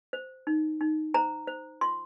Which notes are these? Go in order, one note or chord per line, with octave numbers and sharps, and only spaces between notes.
C5
D#4
D#4
C5 A#5
C5
F4 C6